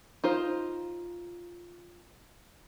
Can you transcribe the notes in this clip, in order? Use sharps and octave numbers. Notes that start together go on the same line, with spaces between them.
D#4 F4 C5